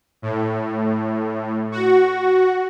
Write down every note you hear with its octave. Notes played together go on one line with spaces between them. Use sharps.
A2
F#4